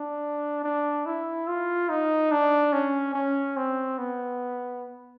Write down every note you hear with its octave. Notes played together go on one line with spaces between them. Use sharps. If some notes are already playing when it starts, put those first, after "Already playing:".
Already playing: D4
D4
E4
F4
D#4
D4
C#4
C#4
C4
B3